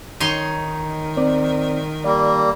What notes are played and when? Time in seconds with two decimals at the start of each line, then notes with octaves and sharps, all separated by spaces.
0.20 D#3 D#4 C#5 C6
1.17 C4 C5 D5
2.04 G3 A#3 D5